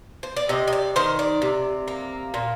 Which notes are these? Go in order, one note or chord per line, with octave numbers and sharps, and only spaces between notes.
C5
D5
C3 D#5
D#5
D5
D#3 C5
D5
C3
A#3
A#2